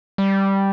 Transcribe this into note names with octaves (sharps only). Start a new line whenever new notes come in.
G3